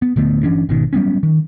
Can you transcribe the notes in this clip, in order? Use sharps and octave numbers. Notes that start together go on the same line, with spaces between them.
B3
D1 D3 A3 B3
G1 E3 C#4 D4
G#1 B2 D#3
F#3 G3 B3 C#4
D#3